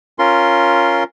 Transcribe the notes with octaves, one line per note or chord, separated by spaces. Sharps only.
C#4 F4 A#4 C6